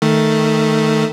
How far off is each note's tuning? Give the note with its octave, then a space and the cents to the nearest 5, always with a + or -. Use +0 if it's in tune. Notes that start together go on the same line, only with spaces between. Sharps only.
D#3 +0 A3 +0